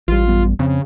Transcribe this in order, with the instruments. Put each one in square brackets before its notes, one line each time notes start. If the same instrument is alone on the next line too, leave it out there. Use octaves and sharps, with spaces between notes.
[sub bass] A1 [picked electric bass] E3 G3 [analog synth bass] F4
[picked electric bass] F#2 G3 B3
[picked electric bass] F2 C4 [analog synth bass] C#3